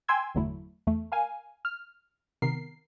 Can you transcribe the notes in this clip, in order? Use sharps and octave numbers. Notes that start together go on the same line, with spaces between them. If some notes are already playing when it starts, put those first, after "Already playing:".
G5 G#5 C6 E6 G#6
G1 E2 D3 F#3 A3 E4
E2 A3
A#4 F5 G#5
F6
C3 D#3 B3 A#4 C7